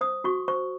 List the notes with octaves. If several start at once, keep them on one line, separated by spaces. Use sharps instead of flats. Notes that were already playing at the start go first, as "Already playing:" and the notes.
C5 D#6
F#4 C#6
C5 C#6